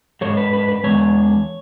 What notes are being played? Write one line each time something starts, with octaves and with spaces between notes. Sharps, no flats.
G#2 E3 G#3 C#5
B4
B4
B4
E2 D#3 G#3 C#5